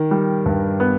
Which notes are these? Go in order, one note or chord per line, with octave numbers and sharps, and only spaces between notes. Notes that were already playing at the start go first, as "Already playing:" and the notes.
Already playing: D#3
G3
G2
B3